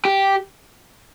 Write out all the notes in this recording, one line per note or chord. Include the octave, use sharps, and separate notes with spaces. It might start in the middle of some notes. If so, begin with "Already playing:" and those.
G4